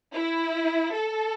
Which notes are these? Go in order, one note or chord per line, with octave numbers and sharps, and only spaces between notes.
E4
A4